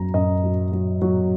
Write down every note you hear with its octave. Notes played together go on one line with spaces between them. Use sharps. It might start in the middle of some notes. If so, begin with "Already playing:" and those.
Already playing: F#2 F#3 A#5
F#2 D#5
F#3
F#3
F#3